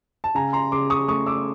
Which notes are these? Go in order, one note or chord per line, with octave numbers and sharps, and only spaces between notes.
A5
C#3 G#5 A#5
A#5 C6
C#3 C6 D6
C#6 D#6
A3 C#6 D#6
D6 E6